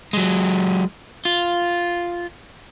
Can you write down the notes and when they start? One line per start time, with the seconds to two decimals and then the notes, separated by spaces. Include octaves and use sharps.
0.13 F#3 G#3
1.25 F4